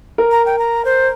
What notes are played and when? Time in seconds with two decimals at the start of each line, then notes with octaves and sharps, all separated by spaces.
0.18 A#4
0.31 A#5
0.46 G5
0.59 A#5
0.85 C5